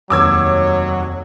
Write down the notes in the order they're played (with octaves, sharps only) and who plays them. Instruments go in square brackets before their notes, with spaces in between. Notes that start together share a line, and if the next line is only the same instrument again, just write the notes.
[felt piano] F1 D#2 [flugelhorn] F#3 [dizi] C#5 [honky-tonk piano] D6 E6 G#6